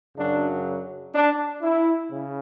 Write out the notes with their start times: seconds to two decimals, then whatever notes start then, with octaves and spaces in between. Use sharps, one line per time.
0.17 F#2 C#3 F#3 D4
1.15 D4
1.63 E4
2.11 C#3